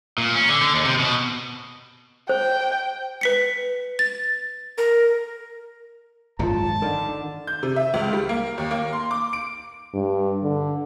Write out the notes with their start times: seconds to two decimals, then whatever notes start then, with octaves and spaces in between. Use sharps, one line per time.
0.18 A#2
0.35 C#4
0.49 D3
0.62 D3
0.73 D#2
0.85 C3
0.99 B2
2.29 C5 G5
3.21 B4 B6 C#7
3.99 A6
4.78 A#4
6.39 G#1 F#2 A#2 F4 A5 A#5
6.82 D3 D#3 A#4
7.47 G6
7.63 C3
7.76 E5
7.94 C#2
8.13 G3
8.29 A#3
8.58 D#2
8.71 A#3
8.93 C6
9.11 D6
9.33 D7
9.94 G2
10.43 D3